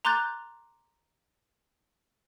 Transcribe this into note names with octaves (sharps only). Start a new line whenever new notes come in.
A#5 C6 D6 F#6 G6 A6